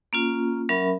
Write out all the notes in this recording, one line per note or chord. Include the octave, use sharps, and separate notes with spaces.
A#3 C#4 F4
F#3 C#4 A#4 E5 B5